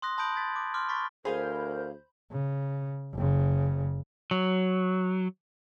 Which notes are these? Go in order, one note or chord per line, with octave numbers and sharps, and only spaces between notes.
C6 D#6 F#6 A#6
A5 B5 D#6 G6 D7 F#7
G#6 A6 B6
D6
C6 D6 F6
B5 C#6 A6 B6
D2 G#4 A#4 C5 F5 G#5 B5 G6
C#3
F#1 C#3
F#3